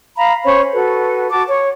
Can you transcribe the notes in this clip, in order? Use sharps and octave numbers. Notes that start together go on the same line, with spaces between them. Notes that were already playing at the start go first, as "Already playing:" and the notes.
F5 A#5 B5
C#4 C5 C#5 B5
F#4 A4 B4
F#4 A5 D6
C#5